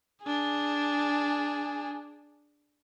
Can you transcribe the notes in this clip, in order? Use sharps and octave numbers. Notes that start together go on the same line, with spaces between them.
D4 G#4